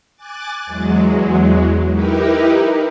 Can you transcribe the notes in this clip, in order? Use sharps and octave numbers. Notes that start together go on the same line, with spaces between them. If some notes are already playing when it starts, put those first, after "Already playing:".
G#5 D6 F#6 A6
E2 F#3 G#3
D#4 E4 G4 A#4 B4